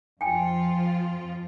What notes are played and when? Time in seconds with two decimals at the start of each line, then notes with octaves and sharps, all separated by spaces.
0.21 F2 F3 F4 G5 G#5